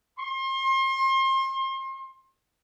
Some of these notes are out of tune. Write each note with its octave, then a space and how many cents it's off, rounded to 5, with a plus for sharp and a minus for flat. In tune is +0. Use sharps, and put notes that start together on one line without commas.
C6 +35